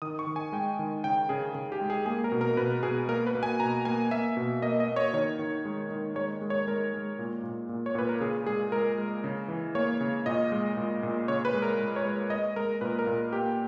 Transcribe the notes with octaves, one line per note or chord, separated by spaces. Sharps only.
D#3 D#6
C#6
D#3
G#5
G#3 G5
D#3
C#3 G5
C#3 G#4
C#3 G#4
G4
G#3
G#4
A#3 G#4
A#4
B2
A#4
B2 B4
B2 G#4
A#3 A#4
B4
A#3
G#5
B2 A#5
A#3 G#5
A#3 E5
B2
A#3 D#5
D#5
A#3
C#5
D#3 C#5
D#3
G#3
D#3
G#3 C#5
G#3
C#5
G#3 A#4
G#3
A#2
A#2
A#2
C#5
A#2 B4
A#4
C#3 G#4
G#3 G#4
G#3 A#4
G#3
C#3
E3
A#3 C#5
C#3
A#2 D#5
G#3
A#2
A#2
C#3 C#5
B4
G#3
A#4
G#3
C#5
G#3
G#3 D#5
G#3 A#4
A#2 B4
A#4
A#2
A#3 G4